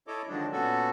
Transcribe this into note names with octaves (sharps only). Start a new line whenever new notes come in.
E4 A4 C#5 D#5 D6
D3 D#3 F3 F#3 G#3 D4
A#2 B3 C#4 F#4 A4